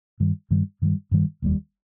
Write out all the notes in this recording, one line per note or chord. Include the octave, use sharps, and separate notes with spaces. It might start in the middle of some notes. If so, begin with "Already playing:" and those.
G2 D#3 G3
G2 D#3 G3
G2 D#3 G3
G2 D#3 G3
F1 D#2 D#3 G3